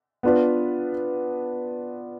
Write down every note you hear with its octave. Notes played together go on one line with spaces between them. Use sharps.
B3 D4 F4 B4